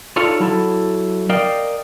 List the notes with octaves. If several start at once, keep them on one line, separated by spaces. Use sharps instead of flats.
D#4 F4 A4 C#5 D5 F5
F#3 E4 A4
A#4 D5 D#5 F5 G5